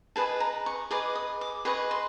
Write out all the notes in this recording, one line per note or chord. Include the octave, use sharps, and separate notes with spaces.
G#4 B4 D#5 A5
A#5
C#6
G#4 B4 D#5 D6
D#6
D6
G#4 B4 D#5 C#6
C6